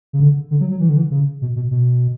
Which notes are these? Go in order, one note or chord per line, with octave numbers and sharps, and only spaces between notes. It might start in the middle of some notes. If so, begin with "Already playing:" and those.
C#3
D3
D3
F#3
F#3
E3
D3
E3
C#3
B2
B2
B2